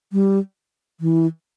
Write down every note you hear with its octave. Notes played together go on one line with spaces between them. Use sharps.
G3
E3